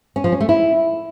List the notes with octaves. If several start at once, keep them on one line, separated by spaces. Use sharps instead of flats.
C#4
F3
C#4
A3
E4